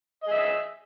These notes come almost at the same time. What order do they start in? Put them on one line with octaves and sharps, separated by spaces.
D#5 G#4 E5